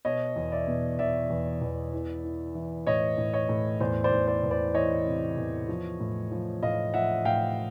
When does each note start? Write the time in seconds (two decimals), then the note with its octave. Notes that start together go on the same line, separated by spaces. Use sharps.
0.05 B2 C#5 D#5
0.36 E2
0.52 D5 E5
0.68 B2
0.99 E2 D5 E5
1.30 E2
1.61 E2
1.93 E3
2.24 E3
2.55 E3
2.87 A2 C#5 D#5
3.18 A2
3.34 C#5 D#5
3.49 A2
3.80 E2 C5 D5
4.04 C5 D5
4.12 E2
4.28 C5 D5
4.43 E2
4.51 C5 D5
4.74 E3 C#5 D#5
5.06 C3
5.37 E2
5.68 F3
6.00 A2
6.32 F3
6.63 A2 D#5 F5
6.94 F3 E5 F#5
7.25 A2 F5 G5